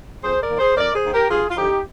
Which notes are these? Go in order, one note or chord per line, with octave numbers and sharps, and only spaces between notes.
F2 G#4 C5
A#4 D5
D#3 A#3
G#4 C5
F2 A#4 D5
G#4 C5
D#3 A#3
G4 A#4
G2 F4 G#4
F4
D3 F3 D#4 G4